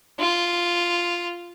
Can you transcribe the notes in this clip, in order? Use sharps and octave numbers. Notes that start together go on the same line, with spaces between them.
F4